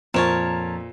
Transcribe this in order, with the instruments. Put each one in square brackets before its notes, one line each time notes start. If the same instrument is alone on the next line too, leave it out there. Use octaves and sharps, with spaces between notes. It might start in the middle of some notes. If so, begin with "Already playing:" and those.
[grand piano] F2 E7 [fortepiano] A#2 [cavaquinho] A#4 C#5 A5 [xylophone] C5 A#5